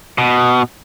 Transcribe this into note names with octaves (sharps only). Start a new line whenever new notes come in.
B2